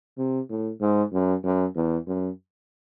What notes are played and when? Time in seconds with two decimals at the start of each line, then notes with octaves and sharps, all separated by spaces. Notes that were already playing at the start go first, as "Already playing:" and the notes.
0.18 C3
0.49 A2
0.81 G#2
1.13 F#2
1.44 F#2
1.75 E2
2.07 F#2